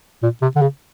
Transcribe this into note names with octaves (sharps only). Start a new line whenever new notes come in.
A#2
C3
D3
C#3